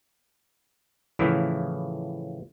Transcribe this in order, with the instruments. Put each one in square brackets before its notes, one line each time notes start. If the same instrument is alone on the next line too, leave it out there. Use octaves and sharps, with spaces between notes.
[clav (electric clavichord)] A2 C#3 E3 F3 E4